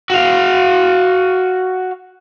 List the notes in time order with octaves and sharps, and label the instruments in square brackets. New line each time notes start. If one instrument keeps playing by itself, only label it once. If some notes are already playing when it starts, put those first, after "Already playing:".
[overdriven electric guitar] F#4 F5